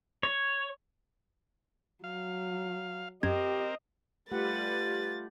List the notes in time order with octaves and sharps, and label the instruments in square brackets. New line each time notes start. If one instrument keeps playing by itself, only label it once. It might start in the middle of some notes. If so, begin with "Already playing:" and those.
[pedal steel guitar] C#5
[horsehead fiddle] F#3 [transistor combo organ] F5
[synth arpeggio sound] F#2 G#6 [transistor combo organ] C4 A#4 [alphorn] G4 [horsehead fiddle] D#5
[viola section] G3 B4 [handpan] A3 G4 F#5 [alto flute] F4 [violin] A6